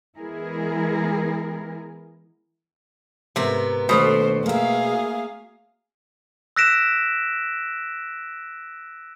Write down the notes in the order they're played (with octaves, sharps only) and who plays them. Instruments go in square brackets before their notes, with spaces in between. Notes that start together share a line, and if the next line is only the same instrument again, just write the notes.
[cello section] E3 G#3 B3 E4 G#4 A#4
[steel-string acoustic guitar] G#2 B3 A#4 [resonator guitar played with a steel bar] C3
[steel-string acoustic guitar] D#2 A3 D4 [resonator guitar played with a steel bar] B2 [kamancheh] C5
[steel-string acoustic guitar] A#3 E5 [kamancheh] G#4 F5
[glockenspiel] E6 F#6 A#6 B6 D7 E7